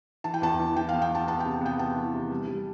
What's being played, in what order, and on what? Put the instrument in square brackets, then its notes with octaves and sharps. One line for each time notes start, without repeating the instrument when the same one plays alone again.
[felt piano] E3 A5
G5
E2 A5
E3
E3 G5
B3 F5
G5
B3 A5
B3 A5
C3 G5
B3 G5
B3 A5
E3
C3
G3
G3